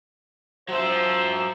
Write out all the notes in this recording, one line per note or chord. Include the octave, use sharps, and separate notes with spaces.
F3 F#3 C5 E5